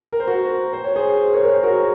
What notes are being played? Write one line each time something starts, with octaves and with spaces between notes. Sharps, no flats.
A#4
C5
F#4 A#4
C5
C#5
G#4 C5
A#4 C#5
A#4 C#5
G#4 C5
F#4 A#4